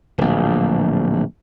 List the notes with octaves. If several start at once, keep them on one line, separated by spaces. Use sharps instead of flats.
D1 A#1